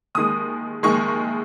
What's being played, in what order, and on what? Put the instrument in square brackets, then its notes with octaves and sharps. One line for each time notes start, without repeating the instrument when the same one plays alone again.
[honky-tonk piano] D#2 D#3 G#3 D#6
D#2 D#3 G#3 C#6